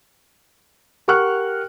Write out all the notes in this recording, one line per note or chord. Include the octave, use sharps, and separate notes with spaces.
G4 A#4 F#5 C#6 F6 F#6